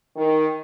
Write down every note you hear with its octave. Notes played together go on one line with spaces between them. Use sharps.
D#3